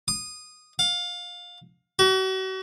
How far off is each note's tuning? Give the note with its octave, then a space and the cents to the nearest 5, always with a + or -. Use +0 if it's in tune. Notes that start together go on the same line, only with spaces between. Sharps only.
D#6 -10
F5 +25
F#4 +40